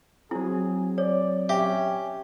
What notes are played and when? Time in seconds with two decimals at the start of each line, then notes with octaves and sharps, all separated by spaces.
0.31 F#3 C4 E4 G#4
0.98 C#5 D5
1.49 C#4 G4 E5